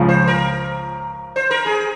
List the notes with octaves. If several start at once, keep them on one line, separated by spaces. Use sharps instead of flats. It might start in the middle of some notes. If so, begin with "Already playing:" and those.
Already playing: C#2 C#3 F3
C5
A#4
C5
A#4
G#4